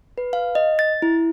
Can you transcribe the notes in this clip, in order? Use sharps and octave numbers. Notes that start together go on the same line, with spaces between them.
B4
F5
D#5
A6
E4